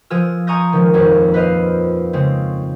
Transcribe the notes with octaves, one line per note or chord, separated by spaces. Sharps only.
F3 F4 G#4 E6
G#5 A#5 C#6 D#6 G6 A#6
D#3 F3 G#3
D#1 F2 C#5
B4 C5 D#5 F5
C#3 G#3 C4